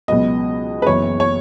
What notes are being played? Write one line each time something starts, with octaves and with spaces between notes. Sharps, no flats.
C#2 B2 F#3 B3 D#5
B4
F#1 F#2 E3 B3 C#5
C#5